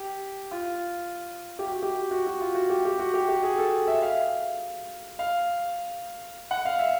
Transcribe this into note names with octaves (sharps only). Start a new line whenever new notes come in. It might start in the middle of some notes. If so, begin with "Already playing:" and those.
Already playing: G4
F4
G4
F#4
G4
F#4
F#4
F4
F#4
G4
G4
F#4
G4
G4
G#4
A4
E5
F5
F5
F#5
F5
E5